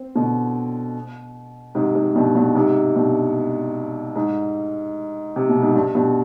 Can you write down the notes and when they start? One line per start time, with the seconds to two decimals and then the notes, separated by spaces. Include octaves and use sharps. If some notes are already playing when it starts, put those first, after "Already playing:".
Already playing: C4
0.15 B2 D3
1.75 G#2 C3
1.95 G#2
2.16 G2 B2
2.35 G2 B2
2.55 G#2 C3
2.95 G2 B2
4.16 G#2
5.36 C3
5.49 B2
5.62 G#2
5.76 G2
5.95 G2 B2